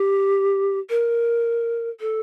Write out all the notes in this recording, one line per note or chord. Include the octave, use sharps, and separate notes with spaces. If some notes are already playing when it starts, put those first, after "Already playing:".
Already playing: G4
A#4
A4